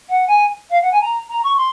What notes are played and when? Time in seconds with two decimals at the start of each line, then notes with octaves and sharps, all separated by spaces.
0.09 F#5
0.27 G#5
0.70 F5
0.82 F#5
0.92 G#5
1.01 A#5
1.29 A#5
1.43 C#6
1.57 C6